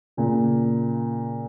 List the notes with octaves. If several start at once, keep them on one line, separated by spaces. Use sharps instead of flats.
A#2 C#3